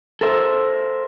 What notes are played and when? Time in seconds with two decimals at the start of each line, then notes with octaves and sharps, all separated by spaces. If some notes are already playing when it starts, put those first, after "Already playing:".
0.21 A4 A#4 C5 E5